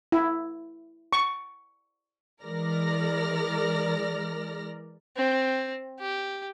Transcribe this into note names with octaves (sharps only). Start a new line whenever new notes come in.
E4
C#6
E3 G#3 A#4 D5 F6 A#6
C4
G4